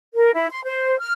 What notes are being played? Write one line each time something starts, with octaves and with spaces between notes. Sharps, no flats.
A#4
E4
C6
C5
F6